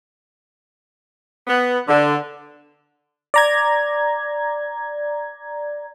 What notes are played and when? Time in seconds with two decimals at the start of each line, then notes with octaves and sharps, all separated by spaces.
1.47 B3
1.87 D3
3.34 D5 A#5 G#6